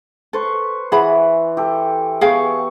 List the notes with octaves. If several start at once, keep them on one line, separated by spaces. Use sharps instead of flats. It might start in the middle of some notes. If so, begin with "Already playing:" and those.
A4 B4 C5 C#6
E3 G#4 F#5 B5
G4 A4
B3 G#4 F5 G5 C#6